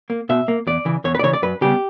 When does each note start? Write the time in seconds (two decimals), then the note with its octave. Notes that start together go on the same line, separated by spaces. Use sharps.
0.10 A#3
0.29 B2 E5
0.48 A#3
0.67 E2 D5
0.85 C#3 E3
1.04 E2 C#5
1.15 B4
1.19 D5
1.23 C#3 E3 C#5
1.33 D5
1.42 F#2 B4
1.61 C#3 G3 B3 G4